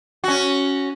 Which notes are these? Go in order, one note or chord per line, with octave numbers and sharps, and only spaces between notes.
C#4 F#4